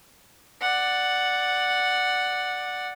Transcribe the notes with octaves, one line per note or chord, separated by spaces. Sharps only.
D5 F#5